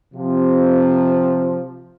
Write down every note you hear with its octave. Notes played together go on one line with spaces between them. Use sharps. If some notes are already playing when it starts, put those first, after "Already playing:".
C3 F3